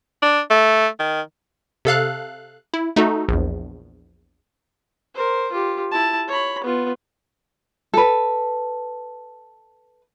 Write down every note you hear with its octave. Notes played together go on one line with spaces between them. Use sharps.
D4
A3
D#3
C3 A4 F5 F#6
E4
A3 D#4 F#4 A4
A#1 E2
A#4 C5
F4 G4
E4 A5
C#5 B5
B3 F4
A4 B4